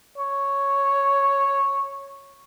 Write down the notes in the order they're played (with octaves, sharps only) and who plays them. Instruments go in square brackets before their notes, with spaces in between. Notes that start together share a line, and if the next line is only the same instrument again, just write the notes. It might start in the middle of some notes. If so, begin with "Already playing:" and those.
[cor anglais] C#5